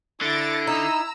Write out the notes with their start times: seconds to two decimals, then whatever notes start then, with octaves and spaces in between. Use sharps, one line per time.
0.21 D3 E4 A6 A#6 D7
0.67 D#4 A#5 E6